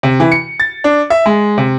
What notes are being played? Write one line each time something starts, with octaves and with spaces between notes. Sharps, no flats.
C3
E3
C#7
A6
D4
E5
G#3
C3